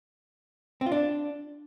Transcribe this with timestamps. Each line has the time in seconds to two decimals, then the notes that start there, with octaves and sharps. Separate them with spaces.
0.81 C4
0.86 F4
0.92 D4